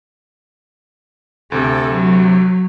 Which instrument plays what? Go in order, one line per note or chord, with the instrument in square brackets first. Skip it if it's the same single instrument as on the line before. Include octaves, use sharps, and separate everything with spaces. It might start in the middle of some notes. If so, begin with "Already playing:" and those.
[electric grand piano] D2 C3 [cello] A4
[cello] F#3